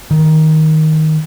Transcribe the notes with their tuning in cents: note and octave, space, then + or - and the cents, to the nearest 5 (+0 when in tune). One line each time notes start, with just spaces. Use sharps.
D#3 +10